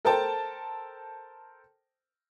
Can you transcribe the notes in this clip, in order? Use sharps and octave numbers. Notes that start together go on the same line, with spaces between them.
A4 A#4 C5 G5 A5